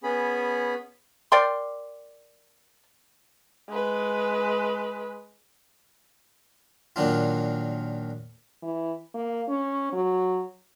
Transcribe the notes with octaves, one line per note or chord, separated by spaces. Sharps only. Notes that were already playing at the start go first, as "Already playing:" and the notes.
B3 C#4 G#4 B5
A#4 D5 G5 C6
G#3 B4
A#2 D#3 F#3 D4 F4
E3
A#3
C#4
F#3